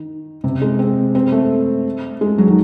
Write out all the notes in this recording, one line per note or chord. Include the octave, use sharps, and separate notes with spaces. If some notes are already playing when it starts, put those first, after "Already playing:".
Already playing: D#3
C3
G#3
C4
C4
A3
G#3
F#3
D#3